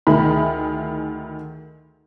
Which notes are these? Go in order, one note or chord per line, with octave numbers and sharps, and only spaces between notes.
D2 D#3 E4 G#4 B5